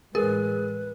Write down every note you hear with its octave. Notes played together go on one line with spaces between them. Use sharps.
A2 E3 G#3 G#4 A#4 B4